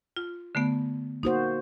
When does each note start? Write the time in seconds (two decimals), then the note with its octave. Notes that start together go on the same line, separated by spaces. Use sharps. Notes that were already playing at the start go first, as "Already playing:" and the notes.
0.17 F4
0.55 D3 A3 B3
1.23 A#3 D#4 F#4 C5